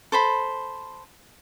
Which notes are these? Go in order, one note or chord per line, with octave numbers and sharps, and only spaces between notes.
A4 C5 B5